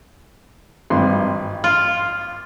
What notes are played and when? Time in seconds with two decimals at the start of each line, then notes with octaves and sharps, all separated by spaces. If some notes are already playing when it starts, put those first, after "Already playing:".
0.90 G#1 G2 C6
1.64 F4